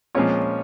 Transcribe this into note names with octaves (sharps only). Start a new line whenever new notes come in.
A#2 F3 G#3 C#4 F4 C#5